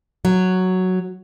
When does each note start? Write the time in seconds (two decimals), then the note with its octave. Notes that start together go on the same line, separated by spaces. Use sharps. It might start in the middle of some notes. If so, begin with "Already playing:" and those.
0.25 F#3